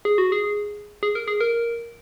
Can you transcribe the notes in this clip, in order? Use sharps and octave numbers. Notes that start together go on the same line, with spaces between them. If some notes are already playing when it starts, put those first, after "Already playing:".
G#4
F#4
G#4
G#4
A#4
G#4
A#4